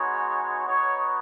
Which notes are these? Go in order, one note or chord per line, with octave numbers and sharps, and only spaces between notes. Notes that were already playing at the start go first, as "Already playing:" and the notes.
Already playing: G#3 B3 D#4 F#4 C#5
B3 D#4 F#4 C#5